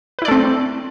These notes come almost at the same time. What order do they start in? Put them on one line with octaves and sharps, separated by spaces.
B4 E4 D5 A3 C4